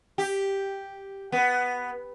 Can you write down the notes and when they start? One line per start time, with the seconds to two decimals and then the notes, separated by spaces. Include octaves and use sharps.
0.18 G4
1.32 B3